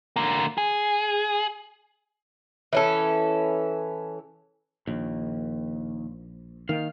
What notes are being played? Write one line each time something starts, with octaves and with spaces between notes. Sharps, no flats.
D3 A#3
G#4
E3 C#4 A4
A#1 D#2
D#3 A#3 F5